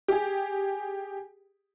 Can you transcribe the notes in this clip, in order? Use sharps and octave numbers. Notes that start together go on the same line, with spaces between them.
G4 G#4